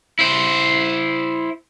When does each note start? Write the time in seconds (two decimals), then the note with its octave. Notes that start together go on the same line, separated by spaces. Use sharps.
0.19 E4 C5